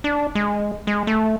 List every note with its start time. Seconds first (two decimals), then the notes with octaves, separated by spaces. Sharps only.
0.04 D4
0.35 G#3
0.87 G#3
1.07 A3